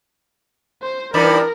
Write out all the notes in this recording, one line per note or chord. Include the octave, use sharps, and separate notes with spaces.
C5
G2 E3 D#4 A#4 D5 B5